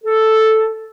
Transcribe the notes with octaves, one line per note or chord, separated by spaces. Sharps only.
A4